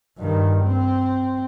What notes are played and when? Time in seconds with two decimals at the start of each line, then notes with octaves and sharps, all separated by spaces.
0.18 G2 D#3
0.65 C4